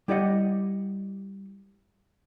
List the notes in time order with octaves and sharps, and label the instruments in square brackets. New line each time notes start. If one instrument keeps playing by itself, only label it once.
[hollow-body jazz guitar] G3 E4 G4 D5 D#5 F#5